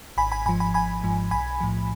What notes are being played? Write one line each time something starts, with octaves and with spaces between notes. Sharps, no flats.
G#1 G#5 B5
G#5 B5
G#2 F3 G#5 B5
G#5 B5
G#1 G#5 B5
G#2 F3
B1 G#5 B5
A2 F3